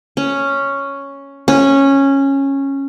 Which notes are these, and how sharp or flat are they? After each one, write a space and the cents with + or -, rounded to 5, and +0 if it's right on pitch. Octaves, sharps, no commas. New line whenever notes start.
C#4 +0
C#4 -10